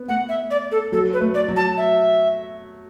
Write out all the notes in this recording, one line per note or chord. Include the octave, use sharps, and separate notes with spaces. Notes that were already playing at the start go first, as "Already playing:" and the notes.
Already playing: B3
A3 F#5
E5
D5
A4
F#3 A4
B4
A3
D5
F#3
A5
E5